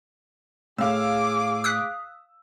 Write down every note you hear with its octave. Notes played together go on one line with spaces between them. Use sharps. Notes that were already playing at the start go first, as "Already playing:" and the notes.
A2 G#4 F5 D6 E6
D#6 F#6 B6